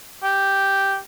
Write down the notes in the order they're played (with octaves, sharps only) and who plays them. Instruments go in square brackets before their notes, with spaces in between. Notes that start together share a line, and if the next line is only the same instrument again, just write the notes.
[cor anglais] G4